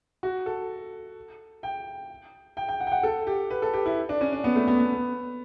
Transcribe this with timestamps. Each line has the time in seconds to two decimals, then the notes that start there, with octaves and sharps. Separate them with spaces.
0.23 F#4
0.46 A4
1.63 G5
2.57 G5
2.68 G5
2.80 F#5
2.87 G5
2.92 F#5
3.03 A4
3.27 G4
3.50 B4
3.62 A4
3.74 G4
3.86 E4
4.09 D4
4.21 C#4
4.33 D4
4.44 B3
4.56 A3
4.67 B3
4.79 B3